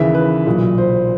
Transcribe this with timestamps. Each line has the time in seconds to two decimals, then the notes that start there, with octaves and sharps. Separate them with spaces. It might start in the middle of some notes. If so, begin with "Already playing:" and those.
Already playing: D#2 C#3 E3 E5
0.15 B4
0.47 B1 A#2
0.78 C5